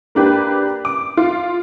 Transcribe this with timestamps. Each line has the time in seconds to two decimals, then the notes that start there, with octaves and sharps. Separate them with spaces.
0.15 A#3 D4 G4 B4
0.85 D6
1.17 F4